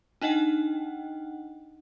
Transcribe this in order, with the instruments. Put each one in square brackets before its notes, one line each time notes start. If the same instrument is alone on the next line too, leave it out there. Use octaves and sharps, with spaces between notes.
[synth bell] D4 D#4 D#5 F#5 G5